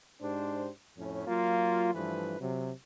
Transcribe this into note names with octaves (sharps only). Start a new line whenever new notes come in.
G#2 D4 G4 C5
F2 A2 C#4
F#3 A#3 F4
G2 E3 F3 A3 B4
C3 F#3